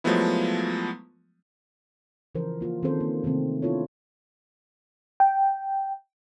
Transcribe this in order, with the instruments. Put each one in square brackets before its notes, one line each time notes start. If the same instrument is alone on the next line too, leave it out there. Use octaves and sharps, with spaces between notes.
[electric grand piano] F3 F#3 G#3 A3 B3 E4
[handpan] C#3 E3 F3 A#4 C5
A#3 F4 F#4
D#3 C4 C#4 G#4 A4 C5
A#3
C3 D#3 A3 C4
B3 D4 E4 F4 A4 C#5
[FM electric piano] G5